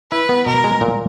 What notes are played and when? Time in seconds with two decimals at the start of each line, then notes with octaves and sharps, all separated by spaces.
0.11 E4 B4
0.29 B3
0.46 B2 A#4
0.64 G#3
0.81 A#2